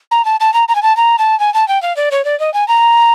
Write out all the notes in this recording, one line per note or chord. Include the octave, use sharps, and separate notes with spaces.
A#5
A5
A5
A#5
A#5
G#5
A5
A#5
A5
G#5
A5
G5
F5
D5
C#5
D5
D#5
G#5
A#5